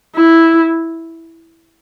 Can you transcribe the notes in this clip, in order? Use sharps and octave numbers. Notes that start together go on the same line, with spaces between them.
E4